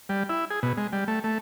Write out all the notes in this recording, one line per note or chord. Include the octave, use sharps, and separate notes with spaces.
G3
E4
G#4
B2
G#3
G3
A3
A3